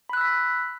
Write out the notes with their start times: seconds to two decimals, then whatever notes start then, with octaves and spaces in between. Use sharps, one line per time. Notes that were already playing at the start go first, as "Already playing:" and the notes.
0.09 B5
0.13 F#6
0.17 E6
0.21 B6